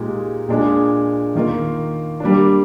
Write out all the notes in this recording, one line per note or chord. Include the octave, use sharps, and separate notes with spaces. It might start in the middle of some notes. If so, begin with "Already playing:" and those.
Already playing: A#2 G#3 D#4 G4
A#2 G#3 D4 G#4
D#3 A#3 F4
G3 A#3 D4